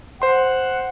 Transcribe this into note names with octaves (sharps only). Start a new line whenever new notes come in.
C5 F#5 C6